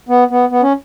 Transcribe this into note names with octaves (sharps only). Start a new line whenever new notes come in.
B3
B3
B3
C#4